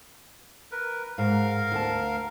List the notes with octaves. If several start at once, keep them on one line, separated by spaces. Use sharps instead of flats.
A#4 B4
G#2 A#4 F5
D2 F#5 A5